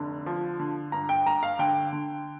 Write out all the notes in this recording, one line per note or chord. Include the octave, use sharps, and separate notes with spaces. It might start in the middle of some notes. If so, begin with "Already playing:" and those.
Already playing: F1 D3
F3
D3
G2 A#5
G5
G2 A#5
F5
D3 G5
D3